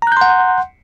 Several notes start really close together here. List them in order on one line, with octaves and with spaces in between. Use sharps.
A#5 F#6 G6 C6 F#5